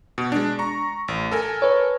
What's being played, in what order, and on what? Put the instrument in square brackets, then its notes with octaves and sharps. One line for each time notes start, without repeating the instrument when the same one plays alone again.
[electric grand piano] B2
G#3 D4
A#5 C#6
A1
A4 A#4 G#5
[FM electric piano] B4 C#5